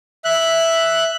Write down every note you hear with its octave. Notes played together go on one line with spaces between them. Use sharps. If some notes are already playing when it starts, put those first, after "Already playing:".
E5 F#6